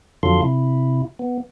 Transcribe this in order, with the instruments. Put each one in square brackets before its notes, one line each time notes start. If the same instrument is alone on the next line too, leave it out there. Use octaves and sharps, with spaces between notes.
[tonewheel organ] F2 D3 F#3 F4 A4 C6
C3 E4
B3